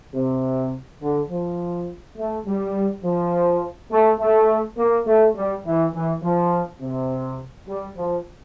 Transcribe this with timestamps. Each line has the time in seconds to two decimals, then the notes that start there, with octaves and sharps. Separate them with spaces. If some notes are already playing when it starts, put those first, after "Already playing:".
0.13 C3
1.01 D3
1.30 F3
2.17 A3
2.46 G3
3.04 F3
3.91 A3
4.20 A3
4.78 A#3
5.07 A3
5.35 G3
5.65 E3
5.94 E3
6.23 F3
6.81 C3
7.68 G3
7.97 F3